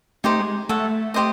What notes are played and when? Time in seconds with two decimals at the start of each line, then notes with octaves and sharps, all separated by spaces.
0.24 A3 D#4 G4 C5
0.39 G#3
0.69 A3 A4 C#5 F#5
1.14 G4 C5 D#5